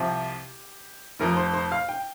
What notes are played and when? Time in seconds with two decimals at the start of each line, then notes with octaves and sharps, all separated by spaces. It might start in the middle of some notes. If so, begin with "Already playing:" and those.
Already playing: C2 C3 F3 G4
1.20 F1 F2 F3 A#4
1.37 C5
1.54 C5
1.72 F5
1.89 G5